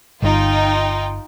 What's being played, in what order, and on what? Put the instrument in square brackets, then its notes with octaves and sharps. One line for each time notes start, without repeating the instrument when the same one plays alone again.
[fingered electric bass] G1 [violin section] D#4 F4 G5